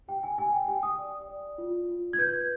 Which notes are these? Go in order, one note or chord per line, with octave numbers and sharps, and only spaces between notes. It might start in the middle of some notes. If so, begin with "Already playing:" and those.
G4 G5
G#5
G4 G#5
G5
G4 G5
D#6
D5
D5
F4
F4
G#6
B4 G6